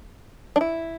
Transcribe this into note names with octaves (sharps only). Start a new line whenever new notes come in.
D4
E4